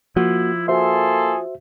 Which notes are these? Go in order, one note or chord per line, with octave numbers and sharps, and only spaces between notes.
F3 A#3 E4 F#4
A#3 F#4 G#4 A4 C5 E5 C6